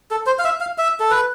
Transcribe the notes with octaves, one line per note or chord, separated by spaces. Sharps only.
A4
C5
F5
E5
F5
E5
A4
B4